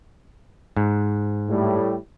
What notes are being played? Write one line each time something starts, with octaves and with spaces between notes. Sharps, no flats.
G#2
A2 G3